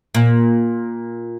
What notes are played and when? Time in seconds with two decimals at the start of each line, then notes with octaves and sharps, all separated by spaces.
0.15 A#2